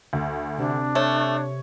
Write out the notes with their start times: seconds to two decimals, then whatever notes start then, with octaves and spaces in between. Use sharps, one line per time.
0.13 D2
0.58 C3 D4
0.95 A3 C#5